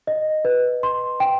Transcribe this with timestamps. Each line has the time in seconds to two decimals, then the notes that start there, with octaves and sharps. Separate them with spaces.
0.07 D#5
0.45 B4
0.83 C6
1.20 G5